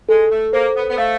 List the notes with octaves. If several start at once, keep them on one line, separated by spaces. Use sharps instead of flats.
G#3 A4
A3
A#3 C5
B3
B3
A3 F5